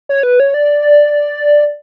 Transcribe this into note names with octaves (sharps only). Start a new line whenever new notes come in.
C#5
B4
C#5
D5